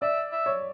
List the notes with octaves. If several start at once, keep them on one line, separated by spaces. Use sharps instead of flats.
D5 E5
E5
C#5